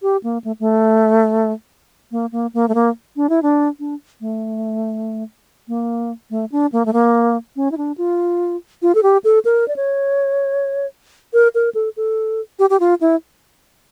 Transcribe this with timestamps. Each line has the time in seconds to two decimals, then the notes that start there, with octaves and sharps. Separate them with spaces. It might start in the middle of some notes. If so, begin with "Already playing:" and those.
0.02 G4
0.23 A#3
0.44 A3
0.60 A3
2.11 A#3
2.32 A#3
2.54 A#3
2.68 A3
2.75 A#3
3.16 D4
3.29 E4
3.42 D4
3.79 D4
4.21 A3
5.68 A#3
6.30 A3
6.52 D4
6.72 A#3
6.86 A3
6.93 A#3
7.56 C#4
7.71 E4
7.77 D4
7.98 F4
8.82 F4
8.95 A4
9.03 G4
9.24 A4
9.45 A#4
9.68 D5
9.76 C#5
11.33 A#4
11.55 A#4
11.75 A4
11.97 A4
12.59 G4
12.70 G4
12.80 F4
13.01 E4